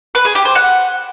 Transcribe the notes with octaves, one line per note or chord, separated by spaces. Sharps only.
B4
G#4
G4
C5
F#5